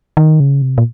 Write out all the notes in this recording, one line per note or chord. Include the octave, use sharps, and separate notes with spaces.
D#3
C#3
C3
A#2